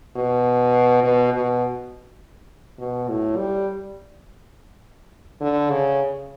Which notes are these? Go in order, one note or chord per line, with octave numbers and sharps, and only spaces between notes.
B2
B2
B2
B2
A2
G3
D3
C#3